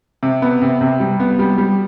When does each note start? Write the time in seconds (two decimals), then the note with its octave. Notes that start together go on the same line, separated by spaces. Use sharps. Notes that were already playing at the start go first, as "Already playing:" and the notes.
0.23 C3
0.42 B3
0.62 C3
0.81 C3
1.00 G3
1.20 B3
1.39 G3
1.58 G3